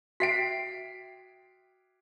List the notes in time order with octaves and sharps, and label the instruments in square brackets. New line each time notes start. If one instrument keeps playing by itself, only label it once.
[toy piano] F#4 E5 G5 [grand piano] B6 C7 D7